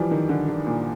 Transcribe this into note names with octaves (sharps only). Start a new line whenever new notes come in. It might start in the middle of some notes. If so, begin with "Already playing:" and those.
Already playing: E3 F3 G3
D#3
D3
D3
A#2